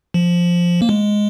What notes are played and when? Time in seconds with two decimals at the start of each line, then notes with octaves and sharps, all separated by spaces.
0.14 F3
0.82 A#3
0.89 G#3